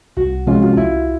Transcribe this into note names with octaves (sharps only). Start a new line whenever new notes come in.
C2 F#4
C3 F3 G#3 C#4 F4
F4
C2 E4